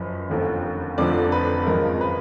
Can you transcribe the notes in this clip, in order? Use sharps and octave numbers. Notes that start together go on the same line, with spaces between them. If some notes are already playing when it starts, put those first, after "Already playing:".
Already playing: F#1 F#2 F3 B4
F1 D#2 D3 F3
F1 F2 D3 F3 D5
B4
G#1 F#2 F3 G#3 A#4
B4